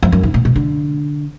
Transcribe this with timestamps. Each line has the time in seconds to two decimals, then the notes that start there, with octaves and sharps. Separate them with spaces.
0.03 F2
0.12 F#2
0.23 G#2
0.34 A#2
0.45 B2
0.56 D3